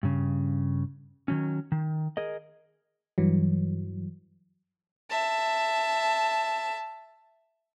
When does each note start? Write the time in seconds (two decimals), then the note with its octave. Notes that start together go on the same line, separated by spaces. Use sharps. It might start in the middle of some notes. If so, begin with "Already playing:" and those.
0.03 G2 C#3
1.28 D#3 F#3 C#4
1.72 D#3
2.17 G#4 A#4 D#5
3.18 G2 E3 F#3
5.09 E5 A5